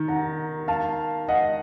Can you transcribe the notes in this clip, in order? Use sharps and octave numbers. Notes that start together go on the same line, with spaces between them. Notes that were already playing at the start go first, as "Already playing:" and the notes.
Already playing: D#3
F#5 A#5
F5 A5
D#5 F#5